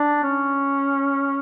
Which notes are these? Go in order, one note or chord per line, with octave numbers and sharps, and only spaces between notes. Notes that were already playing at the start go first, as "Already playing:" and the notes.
Already playing: D4
C#4